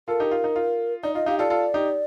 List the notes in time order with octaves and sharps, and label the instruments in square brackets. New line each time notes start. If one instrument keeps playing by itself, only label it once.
[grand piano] F4 A4 [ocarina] A#4
[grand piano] D#4 G4
F4
D#4
F4
[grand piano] D#4 [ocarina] D5
[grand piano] F4 [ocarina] D#5
[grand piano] D#4 G4 [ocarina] F5
[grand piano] F4 A4 [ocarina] D5
[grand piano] F4 A4
D#4 G4